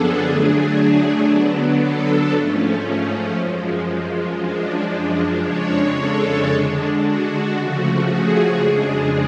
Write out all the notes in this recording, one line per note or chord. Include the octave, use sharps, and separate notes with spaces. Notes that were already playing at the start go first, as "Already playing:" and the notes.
Already playing: F#2 D3 F3 B3 D4 G#4 A4
D3 F#3 A3 D4
D3 F#3 B3 D4
A4
G#2 F3 A3 C#4
F#2 F3 G#3
F#2 F3 G#3 D4
F2 C#3 G#3 D4 C#5
A4
D3 G#3 D4
F#4
C#3 F3 A3
G#4
F2 C#3 G#3 D4